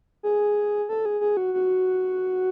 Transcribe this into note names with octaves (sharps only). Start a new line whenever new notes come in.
G#4
A4
G#4
G#4
F#4
F#4